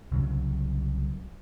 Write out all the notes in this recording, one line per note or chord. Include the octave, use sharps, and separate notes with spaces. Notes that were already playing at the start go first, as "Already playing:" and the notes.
C2 C#3 F#3